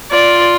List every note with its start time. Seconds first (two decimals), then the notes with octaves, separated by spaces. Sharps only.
0.11 F4 D5